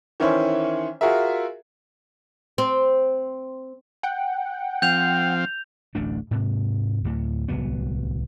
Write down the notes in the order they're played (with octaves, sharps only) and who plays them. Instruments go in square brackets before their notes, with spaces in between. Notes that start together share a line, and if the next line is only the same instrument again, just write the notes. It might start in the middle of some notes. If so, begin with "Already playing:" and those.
[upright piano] D#3 E3 C#4 E4 C5 C#5
F4 F#4 G#4 A#4 E5
[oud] C4
[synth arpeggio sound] F#5 G5
[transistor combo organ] F3 C4 F5 [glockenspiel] G6 F7
[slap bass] D1 A1 A3 D4
G#2 C3
D2 A2
D1 C2 F#3 B3